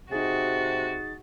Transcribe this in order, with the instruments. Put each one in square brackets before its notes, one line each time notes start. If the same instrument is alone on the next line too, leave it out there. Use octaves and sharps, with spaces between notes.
[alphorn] C3 [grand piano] D#4 G#4 [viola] F#4 [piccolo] A6